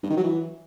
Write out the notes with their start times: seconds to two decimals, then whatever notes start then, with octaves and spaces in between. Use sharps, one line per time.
0.03 G2
0.10 D#3
0.17 F#3
0.23 E3